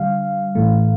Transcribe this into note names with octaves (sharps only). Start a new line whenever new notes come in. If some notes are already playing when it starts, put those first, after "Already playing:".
Already playing: D3 G3 F5
A2 E3 A3